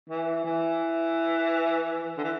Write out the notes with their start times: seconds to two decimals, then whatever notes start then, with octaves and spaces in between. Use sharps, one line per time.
0.09 E3
0.44 E3
2.17 D3
2.24 E3